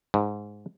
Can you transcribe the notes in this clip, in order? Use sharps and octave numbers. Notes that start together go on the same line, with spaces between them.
G#2